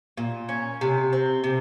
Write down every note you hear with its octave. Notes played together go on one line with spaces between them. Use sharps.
A#2
C#4
C3
C4
C3